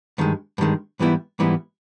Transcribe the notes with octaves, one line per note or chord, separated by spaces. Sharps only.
G2 D#3 G#3
G2 D#3 G#3
G#2 E3 G3 B3 E4
G#2 E3 G3 B3 E4